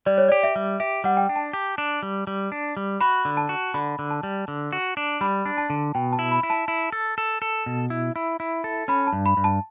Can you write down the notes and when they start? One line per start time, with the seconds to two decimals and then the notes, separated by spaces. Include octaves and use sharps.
0.06 G3 D5
0.18 C#5
0.29 G4 D5
0.43 E5
0.56 G3
0.80 G4 E5
1.04 G3 F#5
1.17 G5
1.29 D4
1.36 A5
1.53 G4
1.78 D4
2.03 G3
2.27 G3
2.52 D4
2.77 G3
3.01 F#4 B5
3.25 D3
3.37 A5
3.49 F#4
3.74 D3 B5
3.99 D3
4.11 A5
4.23 G3
4.48 D3
4.73 F#4
4.97 D4
5.21 G3 B5
5.46 D4
5.57 A5
5.70 D3
5.95 B2 G5
6.13 A5
6.19 E4
6.32 B5
6.43 E4
6.50 A5
6.68 E4
6.92 A4
7.18 A4
7.42 A4
7.66 B2
7.90 E4
8.16 E4
8.40 E4
8.64 A4
8.88 C#4 B5
9.07 A5
9.13 G2
9.26 B5
9.37 G2
9.44 A5